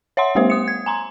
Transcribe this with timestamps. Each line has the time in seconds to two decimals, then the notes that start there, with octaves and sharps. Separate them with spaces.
0.17 C#5 E5 F#5 C6
0.35 G3 A3 B3 G4 C5 E5
0.50 D#6 C#7
0.68 G#6
0.86 G#5 A#5 C6